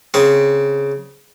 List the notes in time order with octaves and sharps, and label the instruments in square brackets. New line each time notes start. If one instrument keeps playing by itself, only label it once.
[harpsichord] C#3 C4